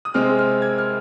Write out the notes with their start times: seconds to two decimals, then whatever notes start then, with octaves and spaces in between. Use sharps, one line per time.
0.05 D#6
0.14 C3 G#3 C4 F6
0.39 F6
0.62 G#6
0.78 F6